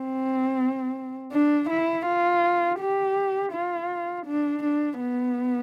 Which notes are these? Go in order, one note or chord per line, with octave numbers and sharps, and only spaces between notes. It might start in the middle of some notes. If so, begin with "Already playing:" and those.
Already playing: C4
D4
E4
F4
G4
F4
D4
D4
B3